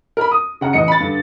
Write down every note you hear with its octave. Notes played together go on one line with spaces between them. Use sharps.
A#4 B5
D#6
C#3 F#5 A#5
A1 D#5 C#7
B5 A6
G2 D3